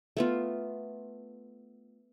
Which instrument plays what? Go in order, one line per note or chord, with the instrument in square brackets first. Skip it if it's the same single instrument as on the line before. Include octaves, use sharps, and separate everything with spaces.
[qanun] A3 B3 F4